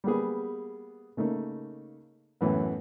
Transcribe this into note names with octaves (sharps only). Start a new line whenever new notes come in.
G3 A#3 B3 G#4
C#3 A3 A#3 D#4
F#2 A2 E3 B3